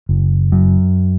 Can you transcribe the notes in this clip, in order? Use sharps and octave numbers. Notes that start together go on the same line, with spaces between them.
F#1
F#2